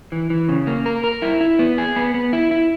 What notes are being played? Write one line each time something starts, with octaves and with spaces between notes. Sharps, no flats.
E3
E3
C#3
A#3
A#4
A#4
E4
E4
B3
G#4
B3
B3
E4
E4